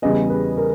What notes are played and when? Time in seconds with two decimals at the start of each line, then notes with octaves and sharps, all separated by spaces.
0.02 E2 C#3 G3 B3 D#5
0.30 B4
0.57 A#4